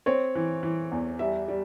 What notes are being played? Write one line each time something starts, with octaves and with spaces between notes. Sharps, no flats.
C4 C#5
E3
E3
E2
G3 E5
G3